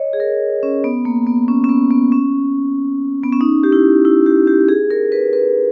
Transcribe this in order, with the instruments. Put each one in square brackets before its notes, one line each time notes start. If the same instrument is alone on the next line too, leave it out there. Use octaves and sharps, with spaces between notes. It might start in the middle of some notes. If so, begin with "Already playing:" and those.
Already playing: [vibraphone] C#5 D#5
G#4
A#4
C#4
B3
A#3
B3
C#4
C#4
B3
B3
C#4
B3
C#4
D#4
G4
E4
E4
G4
G4
G#4
A#4
B4
B4